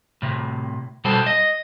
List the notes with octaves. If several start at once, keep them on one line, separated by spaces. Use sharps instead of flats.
A2 C3
B2 G3 A4 C5
D#5